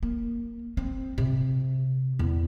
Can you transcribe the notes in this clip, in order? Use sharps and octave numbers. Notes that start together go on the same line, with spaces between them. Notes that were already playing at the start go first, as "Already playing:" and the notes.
A#3
C4
C3
E2